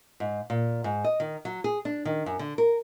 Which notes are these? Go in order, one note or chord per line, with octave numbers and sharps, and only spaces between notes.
G#2
A#2
G#2
D#5
D#3
F#3
G#4
D4
D#3
F#2
D3
A#4